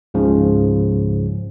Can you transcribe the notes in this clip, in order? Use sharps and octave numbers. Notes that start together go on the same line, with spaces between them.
C#2 G#2 C#3 F3